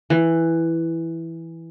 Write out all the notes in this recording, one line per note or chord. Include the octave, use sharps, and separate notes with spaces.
E3